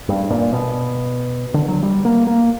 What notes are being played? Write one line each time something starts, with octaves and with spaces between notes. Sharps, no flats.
G2
A#2
B2
D3
F#3
G3
A#3
A#3